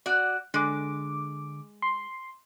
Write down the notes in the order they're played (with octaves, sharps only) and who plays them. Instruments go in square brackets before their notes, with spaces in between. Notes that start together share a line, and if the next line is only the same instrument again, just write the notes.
[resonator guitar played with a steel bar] F#4 D5
[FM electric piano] D3 D6 [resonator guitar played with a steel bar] G#3
[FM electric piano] C6